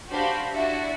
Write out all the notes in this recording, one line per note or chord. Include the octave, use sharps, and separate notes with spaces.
D4 F#4 G4 C5 F5 B5
D4 E4 F#4 D5 E5